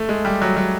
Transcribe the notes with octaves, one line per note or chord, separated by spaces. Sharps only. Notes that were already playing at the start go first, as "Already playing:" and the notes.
Already playing: A3
G#3
G3
F#3
F#3